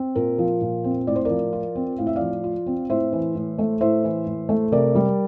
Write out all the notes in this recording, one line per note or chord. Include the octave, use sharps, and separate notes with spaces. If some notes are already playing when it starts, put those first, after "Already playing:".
Already playing: C4
A#2 A#4
F3
A#2
C4
A2 D5
C5
F3 A#4 D5
F4
C4
A2 F5
E5
F3 D5 F5
F4
C4
A2 C5 E5
E3
A2
A3
A2 C5 E5
E3
A2
A3
C3 A#4 D5
G3